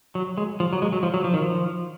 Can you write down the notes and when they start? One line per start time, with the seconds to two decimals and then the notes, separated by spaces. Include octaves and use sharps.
0.15 F#3
0.38 G#3
0.60 F3
0.73 F#3
0.82 G#3
0.93 F#3
1.03 F3
1.14 F#3
1.24 F3
1.34 D#3
1.42 F3